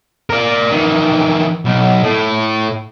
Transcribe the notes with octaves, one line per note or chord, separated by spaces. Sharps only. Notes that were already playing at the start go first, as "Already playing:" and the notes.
A#4 D5
D#3 E3
B1
A2